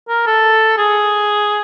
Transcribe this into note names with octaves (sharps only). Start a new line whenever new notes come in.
A#4
A4
G#4